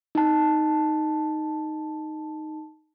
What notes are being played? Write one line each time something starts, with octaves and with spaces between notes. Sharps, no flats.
D#4 A5